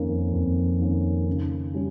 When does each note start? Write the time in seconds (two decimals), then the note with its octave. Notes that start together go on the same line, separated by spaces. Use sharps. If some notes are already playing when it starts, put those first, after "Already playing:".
Already playing: F2 D#3 A#3 C#4
0.33 F2
0.80 D#3 A#3 C#4
1.28 C#3
1.74 G3 C#4